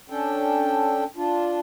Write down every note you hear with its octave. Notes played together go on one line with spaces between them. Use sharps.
C#4 D4 A4 G5
D4 F4